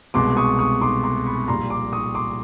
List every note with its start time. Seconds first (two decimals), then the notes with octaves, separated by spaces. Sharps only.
0.14 C2 B2 G#3 C6 D6
0.37 C#6 D#6
0.59 C#6 D#6
0.82 C6 D6
1.03 C6 D6
1.26 B5 C#6
1.48 A#1 A#2 G3 A#5 C6
1.70 C6 D6
1.92 C#6 D#6
2.15 C6 D6